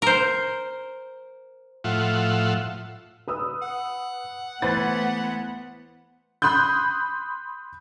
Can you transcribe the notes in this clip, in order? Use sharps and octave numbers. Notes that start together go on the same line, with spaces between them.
A#4 C5
A2 F3 F4 E5 F#5
B4 D#6 E6
F#5
E3 A3 B3 B4 C5 A6
B5 C6 D#6 F#6 G6